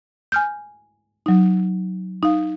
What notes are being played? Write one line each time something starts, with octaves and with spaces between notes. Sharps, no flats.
G#5 F6 G6
F#3 D#4
D#4 F5